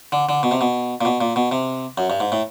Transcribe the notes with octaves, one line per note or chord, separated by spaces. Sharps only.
D3
D3
B2
C3
B2
A#2
B2
A#2
B2
C3
F#2
G2
G#2
A2